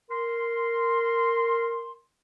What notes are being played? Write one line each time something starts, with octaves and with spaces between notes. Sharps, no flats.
A#4 C6